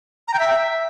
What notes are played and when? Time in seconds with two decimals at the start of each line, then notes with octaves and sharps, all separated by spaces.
0.28 A#5
0.34 G5
0.39 E5